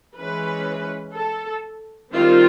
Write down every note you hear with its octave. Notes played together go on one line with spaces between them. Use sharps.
E3 G#3 C#4 B4
A4
D#3 G3 C4 F4